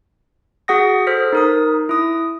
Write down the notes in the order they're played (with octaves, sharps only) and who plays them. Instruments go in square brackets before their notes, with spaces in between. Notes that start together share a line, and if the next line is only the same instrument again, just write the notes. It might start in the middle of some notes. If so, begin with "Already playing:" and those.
[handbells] F#4 G#4 F#5 D#6 A#6
A4 C5 F6 B6
D#4 A#4 D#6
E4 D#6